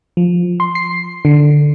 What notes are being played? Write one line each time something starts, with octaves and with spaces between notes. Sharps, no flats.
F3
C6
C7
D3